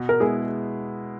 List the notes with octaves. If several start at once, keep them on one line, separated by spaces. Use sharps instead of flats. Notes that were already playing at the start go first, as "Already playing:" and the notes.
Already playing: B2
A#4
G#3 B3 E4 G#4